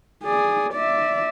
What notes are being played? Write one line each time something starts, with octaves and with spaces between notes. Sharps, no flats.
G#4 D5
D5 E5